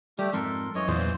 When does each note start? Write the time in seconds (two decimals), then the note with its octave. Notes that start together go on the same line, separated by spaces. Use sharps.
0.19 G3 A3 G4
0.33 F2 G#2 A4 A#4 C6
0.75 F#2 E3 C#5 D#5
0.88 E2 A#2 E3 C5